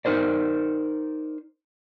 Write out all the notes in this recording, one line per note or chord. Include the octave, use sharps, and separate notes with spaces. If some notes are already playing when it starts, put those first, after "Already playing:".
D#4 A#4 C5 D5